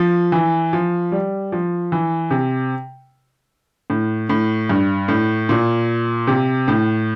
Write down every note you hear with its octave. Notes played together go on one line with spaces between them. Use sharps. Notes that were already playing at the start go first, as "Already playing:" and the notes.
Already playing: F3
E3
F3
G3
F3
E3
C3
A2
A2
G2
A2
A#2
C3
A2